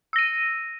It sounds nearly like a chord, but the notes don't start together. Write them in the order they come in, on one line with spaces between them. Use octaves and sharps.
E6 A#6 D#7